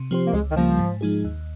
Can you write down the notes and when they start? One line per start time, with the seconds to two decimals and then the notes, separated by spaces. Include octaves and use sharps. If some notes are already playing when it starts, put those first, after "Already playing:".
Already playing: C3
0.11 F3 C4 G4 C5
0.27 A#3
0.33 C#2 G#3
0.51 D#3
0.56 C#3 F3 G3 A#3 F4
0.79 G#2
1.01 F3 G#3 D#4 G#4
1.25 D#2